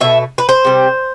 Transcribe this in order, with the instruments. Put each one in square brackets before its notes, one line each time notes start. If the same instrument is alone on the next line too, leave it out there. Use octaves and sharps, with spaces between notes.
[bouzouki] B2 A3 E5
B4
C5
C3 G3